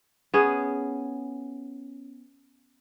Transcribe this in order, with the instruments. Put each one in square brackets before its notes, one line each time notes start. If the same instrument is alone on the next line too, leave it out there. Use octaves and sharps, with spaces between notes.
[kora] B3 C#4 G#4